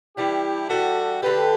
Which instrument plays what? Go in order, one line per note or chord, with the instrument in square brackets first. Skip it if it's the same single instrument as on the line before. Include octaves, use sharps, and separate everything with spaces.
[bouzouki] E3 G3 D4 [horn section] E4 G4
[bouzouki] E3 G3 D4 [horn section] F#4 A4
[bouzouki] D3 A3 D4 A4 [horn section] G4 B4